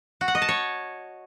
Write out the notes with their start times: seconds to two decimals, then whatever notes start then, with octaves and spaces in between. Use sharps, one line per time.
0.21 F#4
0.28 F#5
0.35 D#5
0.42 A5
0.49 C#5